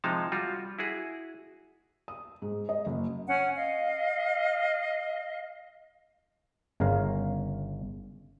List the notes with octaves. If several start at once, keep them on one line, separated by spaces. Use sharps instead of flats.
C3 F3 G#3 D#4 F5 A5
G3 F4 F#4
E4 F#4 G#4
D#6
G#2
D#5
F#1
C#4 F#5
D#5 F5
G1 C#3 A#4 F5